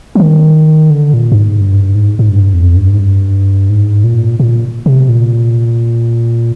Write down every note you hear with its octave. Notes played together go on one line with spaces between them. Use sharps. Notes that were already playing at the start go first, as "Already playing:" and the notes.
F3
D#3
D3
A#2
G2
G#2
G2
G#2
G#2
G2
F2
G2
G#2
G2
G#2
A#2
A#2
C3
A#2